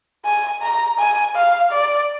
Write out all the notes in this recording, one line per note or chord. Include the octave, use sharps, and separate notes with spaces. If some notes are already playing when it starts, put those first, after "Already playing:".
G#5
A#5
G#5
F5
D5